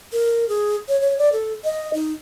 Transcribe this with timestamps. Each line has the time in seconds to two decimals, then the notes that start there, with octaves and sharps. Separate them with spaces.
0.13 A#4
0.49 G#4
0.88 C#5
1.01 C#5
1.18 D5
1.32 A4
1.64 D#5
1.94 D#4